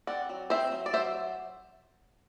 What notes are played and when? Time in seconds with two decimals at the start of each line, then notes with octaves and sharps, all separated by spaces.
0.07 C4 D5 F#5
0.29 F#3
0.50 C4 C5 E5
0.72 F#3
0.86 D5
0.93 F#3 C5 E5